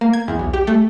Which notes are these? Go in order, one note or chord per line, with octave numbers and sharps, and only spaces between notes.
A#3
G#6
E2
B1
G4
A3